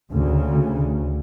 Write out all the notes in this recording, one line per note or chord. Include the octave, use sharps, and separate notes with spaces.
D2 C#3